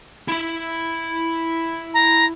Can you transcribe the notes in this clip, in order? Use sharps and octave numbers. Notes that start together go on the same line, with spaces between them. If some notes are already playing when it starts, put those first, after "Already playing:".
E4 B5
A#5